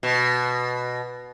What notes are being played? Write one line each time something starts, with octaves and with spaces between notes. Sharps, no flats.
B2